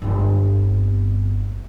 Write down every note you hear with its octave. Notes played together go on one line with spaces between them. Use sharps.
G1 C4